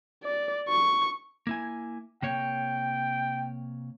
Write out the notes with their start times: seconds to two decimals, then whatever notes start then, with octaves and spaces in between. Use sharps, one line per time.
0.23 D5
0.68 C#6
1.47 A#3 E4 G#5
2.22 C3 A#3 C#5 G5